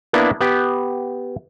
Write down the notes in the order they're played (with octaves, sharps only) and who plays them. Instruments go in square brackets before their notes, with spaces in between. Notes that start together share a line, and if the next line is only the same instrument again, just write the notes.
[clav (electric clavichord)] A#3 B3 D4 E4
B3 G4